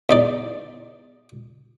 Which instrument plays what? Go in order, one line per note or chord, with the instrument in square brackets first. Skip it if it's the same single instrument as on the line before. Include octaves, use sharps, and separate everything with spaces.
[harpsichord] E2 D#4 D5